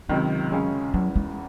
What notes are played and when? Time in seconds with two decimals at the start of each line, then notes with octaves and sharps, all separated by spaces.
0.09 C#2 C3 D#3 F#3
0.52 F#2 C#3 G#3 C#4 G#4
0.94 E2 C#3 E3 F#3
1.16 G#3